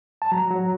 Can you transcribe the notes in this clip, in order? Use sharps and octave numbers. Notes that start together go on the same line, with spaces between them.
A5
F#3 A#5
F#3